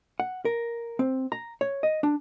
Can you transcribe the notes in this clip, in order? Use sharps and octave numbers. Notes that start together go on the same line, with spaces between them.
F#5
A#4
C4
A#5
C#5
D#5
D4